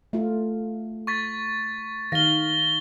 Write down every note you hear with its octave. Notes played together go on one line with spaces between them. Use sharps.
A3 F4
C#6 A6 B6
D#3 F5 A#6 G7